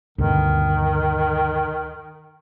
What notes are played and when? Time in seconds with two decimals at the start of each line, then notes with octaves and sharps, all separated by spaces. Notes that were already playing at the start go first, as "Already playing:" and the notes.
0.18 D2 G2 B2 D#3